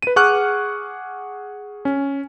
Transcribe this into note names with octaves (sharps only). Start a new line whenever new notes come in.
B4 D#7
G#4 F#5 C#6 D6 F6 F#6
C#4